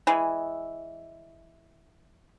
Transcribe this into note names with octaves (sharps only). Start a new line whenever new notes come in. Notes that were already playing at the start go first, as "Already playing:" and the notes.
E3 G#3